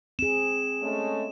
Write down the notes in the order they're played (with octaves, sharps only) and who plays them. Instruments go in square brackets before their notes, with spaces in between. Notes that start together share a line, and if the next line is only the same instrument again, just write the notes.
[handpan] C4 G#4 [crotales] E7
[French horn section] G#3 A3 C#4